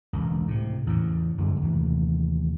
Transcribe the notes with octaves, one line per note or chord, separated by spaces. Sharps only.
E1 C#2
A2 C3
E2 A2 C#3
F#2 D3 G3 G#3
D#2 C3 E3 A3